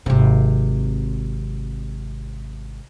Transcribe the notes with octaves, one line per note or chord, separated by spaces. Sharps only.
G#1 C3